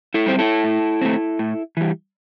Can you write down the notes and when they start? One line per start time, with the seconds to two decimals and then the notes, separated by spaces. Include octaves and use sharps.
0.14 E4 A4
0.26 G3 C4 C5
0.39 E4 A4
0.64 A2
1.01 A3 C4
1.39 A2
1.77 E3 G3